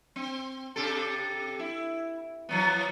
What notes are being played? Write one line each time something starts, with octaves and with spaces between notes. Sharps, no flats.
C4
C3 G4 A4
E4
E3 F#3 B3